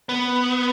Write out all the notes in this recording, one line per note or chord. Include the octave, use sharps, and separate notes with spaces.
B3